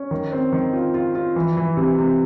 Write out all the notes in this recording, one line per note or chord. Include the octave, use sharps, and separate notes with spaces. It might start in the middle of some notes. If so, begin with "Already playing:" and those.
Already playing: C#4
D#3
C4
D#3
F4
F4
F4
E3
E3
C3
C3